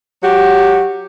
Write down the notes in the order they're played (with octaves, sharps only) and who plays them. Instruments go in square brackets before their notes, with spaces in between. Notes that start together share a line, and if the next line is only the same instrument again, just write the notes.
[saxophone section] F#3 F#4 G4